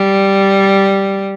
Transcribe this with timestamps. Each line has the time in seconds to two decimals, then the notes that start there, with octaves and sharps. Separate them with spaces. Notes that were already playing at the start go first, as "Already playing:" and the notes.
Already playing: G3